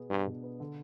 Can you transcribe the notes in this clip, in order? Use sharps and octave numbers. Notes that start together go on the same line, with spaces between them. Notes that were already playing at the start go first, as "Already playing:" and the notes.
Already playing: B2 B3 G#4
G2 D4
B2
B3
D3